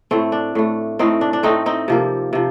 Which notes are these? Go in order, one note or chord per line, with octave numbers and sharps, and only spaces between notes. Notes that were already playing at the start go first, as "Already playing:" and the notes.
A2 A3 C4
D4
A2 A3
A2 A3 C4 D#4
D4
D4
A2 A3 C4 D#4
C4 D#4
C3 F3 A#3
C3 F3